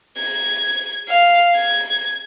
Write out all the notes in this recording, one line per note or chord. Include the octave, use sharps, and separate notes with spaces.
G#6
F5
G#6